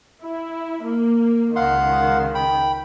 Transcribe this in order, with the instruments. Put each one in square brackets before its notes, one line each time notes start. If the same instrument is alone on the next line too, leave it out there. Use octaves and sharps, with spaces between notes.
[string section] E4
A#3
[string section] C#2 D#3 [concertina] F5 F#5 C6
[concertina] G5 B5